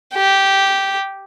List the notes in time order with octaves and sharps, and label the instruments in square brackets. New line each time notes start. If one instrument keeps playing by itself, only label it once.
[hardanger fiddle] G4